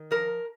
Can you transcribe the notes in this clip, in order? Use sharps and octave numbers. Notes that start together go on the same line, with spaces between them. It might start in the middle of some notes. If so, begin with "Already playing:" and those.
Already playing: D#3
F3 A#4